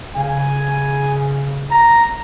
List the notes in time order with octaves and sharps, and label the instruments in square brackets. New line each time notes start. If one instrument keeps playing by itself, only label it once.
[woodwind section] C#3 [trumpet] G#5
[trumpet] A#5